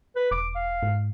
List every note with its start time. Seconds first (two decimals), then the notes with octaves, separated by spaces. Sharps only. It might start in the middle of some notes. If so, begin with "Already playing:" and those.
0.16 B4
0.31 E1 D6
0.55 F5
0.83 G#2